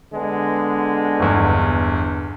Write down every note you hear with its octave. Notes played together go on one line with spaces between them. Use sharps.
D3 G#3 B3
G1 E2